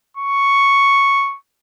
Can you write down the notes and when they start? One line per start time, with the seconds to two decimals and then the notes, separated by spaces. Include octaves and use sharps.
0.17 C#6